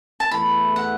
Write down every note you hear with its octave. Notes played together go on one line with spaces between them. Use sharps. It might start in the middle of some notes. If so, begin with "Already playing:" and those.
A5
E2 E3 A3 E4 B5
F#5